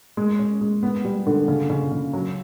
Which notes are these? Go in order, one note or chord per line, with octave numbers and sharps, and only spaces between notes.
G#3
C#4
G#3
B3
G3
D3
C#3
C#3
C#3
F#3